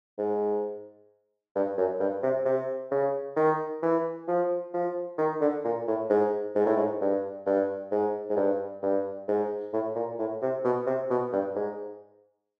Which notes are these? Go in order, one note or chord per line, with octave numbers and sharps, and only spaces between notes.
G#2
G2
F#2
G2
C3
C3
C#3
D#3
E3
F3
F3
D#3
D3
A#2
A2
G#2
G#2
A2
G#2
G2
G2
G#2
G#2
G2
G2
G#2
A2
A#2
A2
C3
B2
C3
B2
G2
G#2